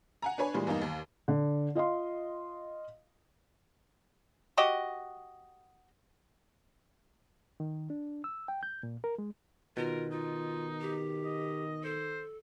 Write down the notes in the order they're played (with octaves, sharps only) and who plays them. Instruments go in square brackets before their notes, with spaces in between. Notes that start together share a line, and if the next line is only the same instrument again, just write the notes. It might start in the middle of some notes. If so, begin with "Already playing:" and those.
[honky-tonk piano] F#5 G#5 A#5
D4 B4 C#5 G#5
A#2 E3 G3 G#3
E2 G2 A#3 D#4
D#2
[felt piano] D3
F4 D#5 F5 C6
[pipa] F#4 G4 D#5
[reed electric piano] D#3
D4
E6
G5
G6
A#2
A#4
G#3
[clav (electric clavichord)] B2 [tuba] D#3 [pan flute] F4 [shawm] A#4
[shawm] D#4 [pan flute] F4
[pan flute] G4
[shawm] D#5
[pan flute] A4 [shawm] C5